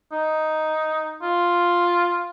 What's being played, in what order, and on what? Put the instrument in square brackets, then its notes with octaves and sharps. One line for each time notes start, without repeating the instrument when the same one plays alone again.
[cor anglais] D#4
F4